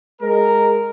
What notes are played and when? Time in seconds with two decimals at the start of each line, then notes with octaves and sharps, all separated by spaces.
0.21 G#3 A#4